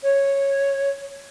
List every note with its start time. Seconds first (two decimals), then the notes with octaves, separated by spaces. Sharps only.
0.03 C#5